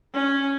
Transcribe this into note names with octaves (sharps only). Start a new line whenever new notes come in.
C#4